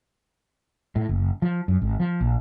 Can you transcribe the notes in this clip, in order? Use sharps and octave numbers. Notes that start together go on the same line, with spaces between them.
A2
F#1
F3
F#2
G#1
F3
A#1